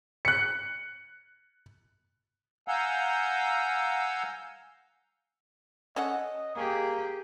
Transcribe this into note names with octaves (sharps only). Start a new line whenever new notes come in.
F#6 C#7
F5 F#5 G#5 A#5 E6 G6
C#4 A4 D#5 F#5
A#3 G4 G#4